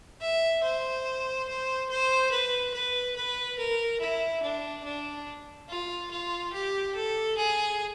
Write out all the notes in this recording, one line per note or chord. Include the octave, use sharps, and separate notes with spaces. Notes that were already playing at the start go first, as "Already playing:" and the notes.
E5
C5
C5
C5
B4
B4
B4
A#4
E4
D4
D4
F4
F4
G4
A4
G#4